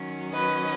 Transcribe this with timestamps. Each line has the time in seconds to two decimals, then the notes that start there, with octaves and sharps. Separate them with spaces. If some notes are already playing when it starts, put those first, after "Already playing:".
Already playing: D#3 F#3 C#4
0.33 B4 D#5